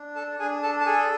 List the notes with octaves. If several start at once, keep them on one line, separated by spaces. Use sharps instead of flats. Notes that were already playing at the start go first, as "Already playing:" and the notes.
Already playing: D4
A4 A5
D4 G#4 G#5
A4 A5
A5
G#4 A4 G#5